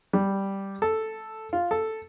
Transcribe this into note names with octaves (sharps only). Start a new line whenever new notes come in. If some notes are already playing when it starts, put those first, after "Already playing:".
G3
A4
F4
A4